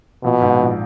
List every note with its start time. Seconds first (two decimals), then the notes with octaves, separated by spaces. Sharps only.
0.24 A#1 B2
0.42 G#2
0.60 A#1